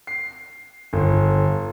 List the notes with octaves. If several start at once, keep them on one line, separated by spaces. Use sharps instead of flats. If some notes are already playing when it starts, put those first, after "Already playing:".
C7
G1